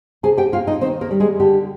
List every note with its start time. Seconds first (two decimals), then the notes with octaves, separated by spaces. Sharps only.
0.23 C3 G#4 G#5
0.37 G4 G5
0.52 A#3 F4 F5
0.67 D#4 D#5
0.81 D#3 C4 C5
1.01 A#3 A#4
1.11 G3
1.20 G#3 G#4
1.40 D3 G4